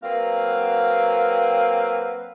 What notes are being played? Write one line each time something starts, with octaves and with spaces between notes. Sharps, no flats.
F#3 A#3 C4 B4 F5